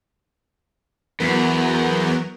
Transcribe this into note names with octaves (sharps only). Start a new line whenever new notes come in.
E2 F#3 B3 A#4